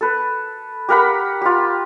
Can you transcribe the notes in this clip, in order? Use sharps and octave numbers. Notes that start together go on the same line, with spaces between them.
A4 B4
G4 A#4 F#5 B5
F4 G4